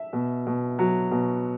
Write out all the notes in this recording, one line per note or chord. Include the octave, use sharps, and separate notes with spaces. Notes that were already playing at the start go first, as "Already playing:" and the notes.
Already playing: E5
B2
B2
F#3
B2